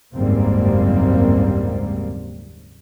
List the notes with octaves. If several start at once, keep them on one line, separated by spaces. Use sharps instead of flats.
F#1 D#2 G#2 G3 A#3 C4